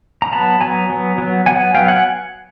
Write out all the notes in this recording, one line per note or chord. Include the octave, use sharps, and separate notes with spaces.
A#5
F#3 B3 A5 B5
F#3 B3 G#5 A#5
F#3 B3
F#3 B3
F#3 B3 F#5 G#5
F#3 B3 F5 G5
F#5 G#5